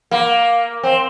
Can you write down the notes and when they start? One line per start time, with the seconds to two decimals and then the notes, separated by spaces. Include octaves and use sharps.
0.11 A#3
0.83 C4